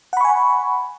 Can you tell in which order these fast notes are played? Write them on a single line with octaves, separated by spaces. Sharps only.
F#5 B5 C#6 G#5